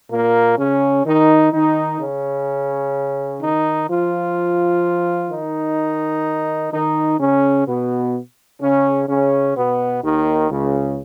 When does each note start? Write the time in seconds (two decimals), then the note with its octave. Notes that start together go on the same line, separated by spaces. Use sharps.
0.11 A#2 A#3
0.58 C#3 C#4
1.05 D#3 D#4
1.53 D#3 D#4
2.00 C#3 C#4
3.42 D#3 D#4
3.89 F3 F4
5.31 D#3 D#4
6.73 D#3 D#4
7.20 C#3 C#4
7.67 B2 B3
8.61 C#3 C#4
9.08 C#3 C#4
9.57 B2 B3
10.03 D#2 D#3
10.50 C#2 C#3